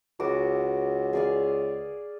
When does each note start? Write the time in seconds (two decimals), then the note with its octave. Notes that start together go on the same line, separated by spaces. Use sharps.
0.20 C#2 F#4 D6
1.13 G#4 D5 F5